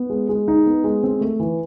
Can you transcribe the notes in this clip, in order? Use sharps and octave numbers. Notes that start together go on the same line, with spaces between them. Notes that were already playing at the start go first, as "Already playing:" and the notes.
Already playing: B3
G#3
G#3
D#4
B3
G#3
C4
A3
E3